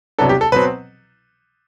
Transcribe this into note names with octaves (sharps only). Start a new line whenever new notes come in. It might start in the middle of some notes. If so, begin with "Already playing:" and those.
C2 C3 F#3 B3 D4 A4
G4
A4
B2 F#3 C4 B4